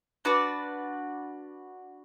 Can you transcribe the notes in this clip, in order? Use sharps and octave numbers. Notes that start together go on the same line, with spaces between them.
D4 F#4 B4 D5